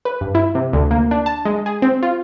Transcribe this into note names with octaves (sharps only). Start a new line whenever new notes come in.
B4
G2
E4
C3
D2
A#3
D4
A5
G#3
G#4
C4
F4